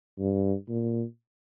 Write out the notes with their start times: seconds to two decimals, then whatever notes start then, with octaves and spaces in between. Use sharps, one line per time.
0.19 G2
0.69 A#2